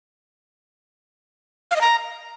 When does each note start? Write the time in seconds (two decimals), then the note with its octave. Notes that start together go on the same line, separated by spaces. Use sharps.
1.71 F5
1.76 D#5
1.81 A#5